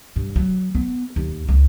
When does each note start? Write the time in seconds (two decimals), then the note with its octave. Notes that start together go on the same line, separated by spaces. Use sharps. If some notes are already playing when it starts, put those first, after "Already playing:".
0.16 G2
0.36 F#3
0.75 B3
1.16 D#2
1.49 C#2